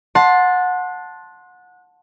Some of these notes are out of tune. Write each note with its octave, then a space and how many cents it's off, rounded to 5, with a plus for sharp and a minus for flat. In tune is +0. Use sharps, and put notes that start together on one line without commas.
F#5 -25 A5 +0 C6 +10